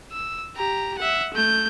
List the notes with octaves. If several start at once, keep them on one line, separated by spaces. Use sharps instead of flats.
E6
G4 A#5
E5 F#5
A3 G6